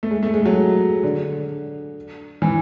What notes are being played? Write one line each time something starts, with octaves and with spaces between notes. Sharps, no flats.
A3
G#3
A3
G#3
F#3
D3
E3